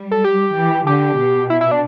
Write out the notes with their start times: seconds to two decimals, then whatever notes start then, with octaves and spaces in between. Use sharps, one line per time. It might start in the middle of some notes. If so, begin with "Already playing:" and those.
Already playing: G3
0.11 A4
0.24 G4
0.55 E3
0.87 D3 G4
1.18 B2
1.50 E4
1.61 E4
1.71 D4